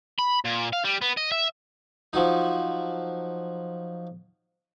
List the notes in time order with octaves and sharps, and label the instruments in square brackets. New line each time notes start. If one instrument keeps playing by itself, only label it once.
[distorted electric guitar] B5
A#2
F5
G3
B3
D#5
E5
[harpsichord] F3 F#3 D#4